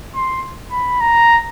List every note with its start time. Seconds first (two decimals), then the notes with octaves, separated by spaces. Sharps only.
0.15 C6
0.71 B5
1.01 A#5